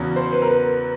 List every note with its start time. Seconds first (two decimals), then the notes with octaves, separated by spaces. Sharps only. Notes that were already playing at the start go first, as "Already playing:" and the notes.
Already playing: E2 C#3 F#3 B3
0.16 C5
0.32 B4
0.42 A#4
0.48 B4